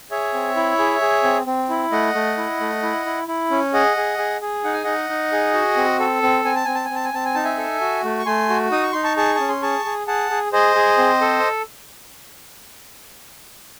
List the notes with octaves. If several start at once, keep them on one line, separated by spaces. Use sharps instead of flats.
G#4 C#5 E5
C4
E4
G#4
G#4
C4
C4
E4
A3 D#5 F#5
A3
E4
A3
E4
E4
E4
C#4
G#4 D#5 F#5
G#4
G#4
G#4
D#4 F#5
G#5
D#4 D#5 F#5
D#4
G#4
F#4
C4
A4
C4
C4 G#5
A5
C4 G#5
A5
G#5
C4
A5
G#5
C4 A5
G#5
D#4 A5
E5 G#5
A4
F#4
A3
C#6
A3 G#5 C6
F#4
D#4 D#6
C#6
D#4 C6
A5 C#6
G#4 A5 C#6
C#4 A5
C6
G#4 A5 C#6
G#4
G#4 F#5 A5
G#4
G#4 C5 D#5
G#4
C4
A4